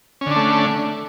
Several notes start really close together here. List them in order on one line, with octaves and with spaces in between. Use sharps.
C#4 D3 D4 A3